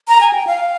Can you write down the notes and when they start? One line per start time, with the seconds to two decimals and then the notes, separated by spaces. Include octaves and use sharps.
0.08 A#5
0.21 G#5
0.33 G5
0.47 F5